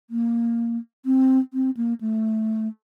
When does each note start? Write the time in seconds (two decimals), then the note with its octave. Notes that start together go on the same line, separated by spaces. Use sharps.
0.10 A#3
1.06 C4
1.54 C4
1.77 A#3
2.01 A3